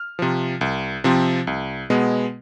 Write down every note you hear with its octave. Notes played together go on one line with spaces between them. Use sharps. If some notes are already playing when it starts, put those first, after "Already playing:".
Already playing: F6
C3 F3
C2
C3 F3 C4
C2
B2 G#3 B3